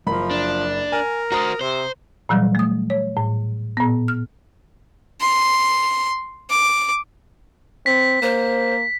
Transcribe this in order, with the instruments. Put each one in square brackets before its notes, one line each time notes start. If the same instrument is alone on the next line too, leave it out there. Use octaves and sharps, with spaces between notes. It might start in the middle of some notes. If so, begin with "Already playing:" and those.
[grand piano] F#1 A#4 B5 [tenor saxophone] F3
[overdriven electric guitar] D4
[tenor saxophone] A#4 [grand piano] G#5
[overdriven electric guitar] F#4 C5 [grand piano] A#5 D#6
[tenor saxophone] C3 [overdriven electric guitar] C5
[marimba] A#2 E3 F#3 G3
A3 D#6
C#5
A2
A#2 B3
F6
[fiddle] C6
D6
[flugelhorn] C4 [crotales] B6
[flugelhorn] A#3 [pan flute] C5